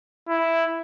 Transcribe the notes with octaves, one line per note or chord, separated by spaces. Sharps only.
E4